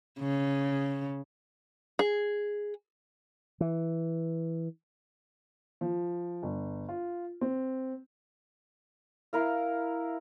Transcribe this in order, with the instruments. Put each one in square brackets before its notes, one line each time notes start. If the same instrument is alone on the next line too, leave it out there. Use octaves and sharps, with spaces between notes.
[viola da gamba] C#3
[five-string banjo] G#4
[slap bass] E3
[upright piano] F3
G1
F4
C4
[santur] E4 A#4 F5